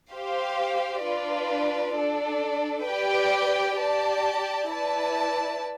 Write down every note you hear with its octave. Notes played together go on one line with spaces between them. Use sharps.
G4 C5 F5
D4 F4 B4 D5
D4 A4 D5
G4 B4 D5 G5
G4 D5 A5
E4 B4 D5 A5